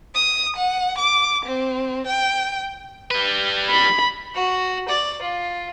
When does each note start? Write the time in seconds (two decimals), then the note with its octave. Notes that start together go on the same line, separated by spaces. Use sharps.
0.15 D#6
0.57 F#5
0.99 D6
1.46 C4
2.07 G5
3.11 G3 B4
3.70 B5
4.34 F#4
4.88 D5
5.22 F4